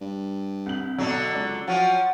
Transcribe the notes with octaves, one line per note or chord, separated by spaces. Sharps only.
G2
C2 F#7
G#1 B2 D3 F#3 A5
C#2 D5
F3 F#3 C#4 F#5